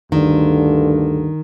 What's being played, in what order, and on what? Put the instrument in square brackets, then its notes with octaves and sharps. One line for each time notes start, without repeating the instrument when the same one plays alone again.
[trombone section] D2 G2 D3 [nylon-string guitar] D#3